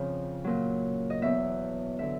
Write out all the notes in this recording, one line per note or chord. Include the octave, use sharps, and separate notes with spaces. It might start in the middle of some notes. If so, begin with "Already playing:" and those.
Already playing: F2 C#3 F3
A#2 F#3
D#5
E2 B2 F#3 E5
D3 F#3 E5